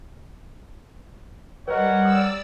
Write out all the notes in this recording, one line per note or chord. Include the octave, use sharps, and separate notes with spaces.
G3 A#4 B4 C#5 D#5 F#5
D5 D#6 E6